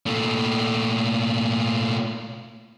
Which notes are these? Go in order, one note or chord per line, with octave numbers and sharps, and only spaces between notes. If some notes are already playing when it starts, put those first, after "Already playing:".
A#2 A3